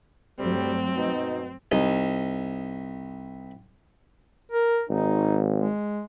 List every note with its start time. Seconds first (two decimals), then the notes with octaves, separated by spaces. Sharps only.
0.39 D2 G2 F#3 G3 A3 C4
0.97 B2 D#4
1.72 C2 D#4
4.52 A#4
4.89 G#1 D#4
5.59 G#3